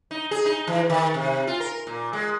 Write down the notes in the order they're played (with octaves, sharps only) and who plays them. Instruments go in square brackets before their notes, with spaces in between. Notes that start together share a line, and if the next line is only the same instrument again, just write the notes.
[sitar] D#4
G#4
D#4
E3
D#3
C3
F4
A#4
A#2
G#3